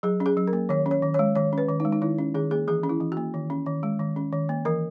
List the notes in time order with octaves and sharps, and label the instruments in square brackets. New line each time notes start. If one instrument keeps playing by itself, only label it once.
[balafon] F#3 G#4
C#4
G#4
F#3
A#4
A#3
D#3 C#5
C#4
C#5
D#3
G#3 C#5
D#3 C#5
C#4 B4
D#3
D#4
G#3
D#4
D#3 E4
C#4
D#3 G#4
A#3 G#4
E3 G#4
C#4
E4
E3
F#4
A#3
D#3
C#4
D#3
G#3
D#3
C#4
D#3
A#3
E3 A#4